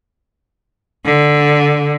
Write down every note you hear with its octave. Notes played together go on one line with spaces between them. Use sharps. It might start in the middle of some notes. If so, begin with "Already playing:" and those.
D3